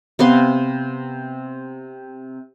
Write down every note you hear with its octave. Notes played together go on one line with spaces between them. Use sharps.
C3 B3 F5 C6